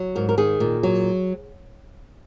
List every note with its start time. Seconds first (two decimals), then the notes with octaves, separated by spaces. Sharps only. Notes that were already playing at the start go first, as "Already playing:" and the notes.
Already playing: F#3
0.16 G#2 A#4
0.29 A#4
0.38 D#3 G#4
0.60 A#2
0.83 F#3